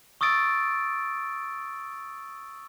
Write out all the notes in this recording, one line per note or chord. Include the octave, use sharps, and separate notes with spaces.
C#6 D#6 E6 A6 D7